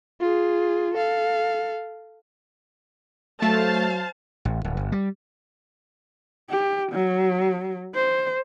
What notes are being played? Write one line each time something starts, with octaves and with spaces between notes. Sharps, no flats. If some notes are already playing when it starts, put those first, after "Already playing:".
F4 G#4
A4 F5
F#3 A3 C5 F5 A5
A1
D1
G1
G3
G4
F#3
C5